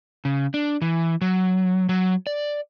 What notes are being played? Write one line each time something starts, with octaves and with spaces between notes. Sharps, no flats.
C#3
D4
E3
F#3
F#3
D5